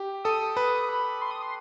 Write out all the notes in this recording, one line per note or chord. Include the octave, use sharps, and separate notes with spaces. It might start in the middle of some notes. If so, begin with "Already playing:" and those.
Already playing: G4
A4 D#6
B4
B5
C6
D#6
C6